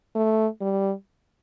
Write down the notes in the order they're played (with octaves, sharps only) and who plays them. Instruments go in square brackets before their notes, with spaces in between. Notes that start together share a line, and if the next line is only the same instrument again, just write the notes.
[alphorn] A3
G3